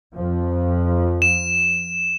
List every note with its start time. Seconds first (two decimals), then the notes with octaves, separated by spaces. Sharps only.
0.16 F2 F3
1.22 E7